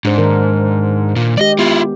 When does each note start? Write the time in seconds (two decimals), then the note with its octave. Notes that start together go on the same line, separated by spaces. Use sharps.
0.05 G#2 D4 C5
0.18 D#3 A#4
1.16 A#2
1.38 G#3 G4 D5 D#5
1.59 B3 E4 F4 G4